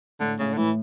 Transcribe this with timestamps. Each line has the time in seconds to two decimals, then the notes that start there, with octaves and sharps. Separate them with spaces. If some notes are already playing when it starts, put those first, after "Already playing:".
0.20 A2 D3
0.39 A2 C#3
0.54 D3
0.57 A2 E3